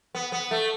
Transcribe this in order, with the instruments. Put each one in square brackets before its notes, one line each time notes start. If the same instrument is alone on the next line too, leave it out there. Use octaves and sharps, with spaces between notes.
[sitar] B3
B3
A3